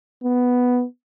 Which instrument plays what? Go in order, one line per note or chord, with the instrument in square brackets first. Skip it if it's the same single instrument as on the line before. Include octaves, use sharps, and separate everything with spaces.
[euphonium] B3